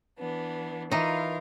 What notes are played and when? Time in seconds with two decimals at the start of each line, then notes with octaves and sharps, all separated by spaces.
0.18 E3 B3 D4
0.91 E3 D#4 F4 A#4 F5